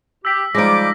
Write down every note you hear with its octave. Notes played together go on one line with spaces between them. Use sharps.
G4 E6 B6
F3 G3 G#3 D#4 D6 A#6 B6